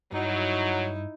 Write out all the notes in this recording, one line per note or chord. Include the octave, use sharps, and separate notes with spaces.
G2 F#3 D#4 E4